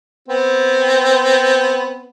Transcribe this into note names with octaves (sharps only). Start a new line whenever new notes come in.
B3 C4